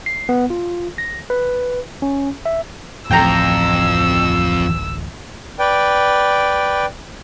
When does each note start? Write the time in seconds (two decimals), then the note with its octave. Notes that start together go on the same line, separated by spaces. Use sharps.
0.06 C7
0.29 B3
0.50 F4
0.98 A#6
1.30 B4
2.02 C#4
2.46 E5
3.11 D1 A1 F2 G5 A#5 E6
5.59 B4 D5 G5